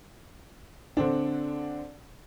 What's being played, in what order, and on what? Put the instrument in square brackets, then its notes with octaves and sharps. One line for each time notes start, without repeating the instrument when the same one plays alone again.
[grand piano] D3 C4 D4